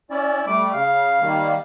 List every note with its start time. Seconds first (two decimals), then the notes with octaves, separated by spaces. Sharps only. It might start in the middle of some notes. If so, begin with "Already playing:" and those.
0.11 C#4 E4 D5
0.47 G3 A3 D6
0.74 C#3 F5
1.22 D#3 G3 A#3